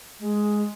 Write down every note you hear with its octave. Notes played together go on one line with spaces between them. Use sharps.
G#3